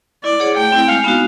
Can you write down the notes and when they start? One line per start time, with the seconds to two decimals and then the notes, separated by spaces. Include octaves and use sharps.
0.24 E4 D5
0.40 G#4 C#5 F#5
0.57 A3 G5
0.72 C4 E4
0.88 G#3 F5
1.04 B3 D#4 F#4